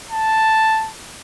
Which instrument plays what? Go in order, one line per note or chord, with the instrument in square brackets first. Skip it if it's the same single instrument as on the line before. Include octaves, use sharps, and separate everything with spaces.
[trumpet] A5